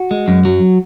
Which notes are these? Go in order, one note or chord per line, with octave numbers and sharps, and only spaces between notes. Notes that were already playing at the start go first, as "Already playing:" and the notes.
Already playing: F#4
G#3
F#2
F#3